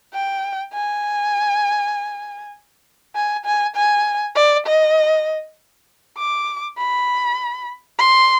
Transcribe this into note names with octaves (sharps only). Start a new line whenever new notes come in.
G5
G#5
G#5
G#5
G#5
D5
D#5
D6
B5
C6